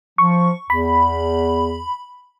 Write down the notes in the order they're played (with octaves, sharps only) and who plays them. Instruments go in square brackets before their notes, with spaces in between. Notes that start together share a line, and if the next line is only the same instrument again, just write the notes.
[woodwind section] F3 [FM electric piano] C#6
[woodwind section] E2 [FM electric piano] B5